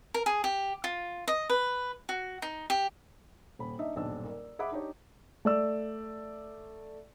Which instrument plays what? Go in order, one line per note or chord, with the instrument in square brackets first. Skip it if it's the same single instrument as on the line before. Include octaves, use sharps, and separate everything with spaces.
[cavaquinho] A#4
G#4
G4
F4
D#5
B4
F#4
D#4
G4
[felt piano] D#1 B5
D4 D#4 D#5 E5
D#1 B1 G2 D4 E6
A#4 D5
G#4 E5 F#5 B5 D6
D4 D#4 G4 C#5
[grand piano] A3 D5 E6